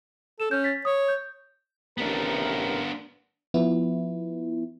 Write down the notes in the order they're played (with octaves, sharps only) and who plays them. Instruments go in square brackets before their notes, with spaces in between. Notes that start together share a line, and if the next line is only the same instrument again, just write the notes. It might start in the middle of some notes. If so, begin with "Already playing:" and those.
[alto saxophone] A4 [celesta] E7
[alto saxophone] C#4 [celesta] G6
[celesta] A6 B6
[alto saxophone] C#5 [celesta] D#6
[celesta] G6
[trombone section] A1 C3 A#4 [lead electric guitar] B3 D4
[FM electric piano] F3 B3 E4